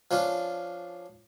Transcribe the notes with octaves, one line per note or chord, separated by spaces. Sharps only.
F3 C#4 D4 F4